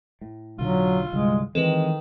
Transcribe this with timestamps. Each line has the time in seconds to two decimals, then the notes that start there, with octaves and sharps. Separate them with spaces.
0.21 A2
0.59 B1 A2 D3 F#3 F4
1.13 C2 G2 D3 G#3
1.55 D#3 E3 G#3 C4 A4 B4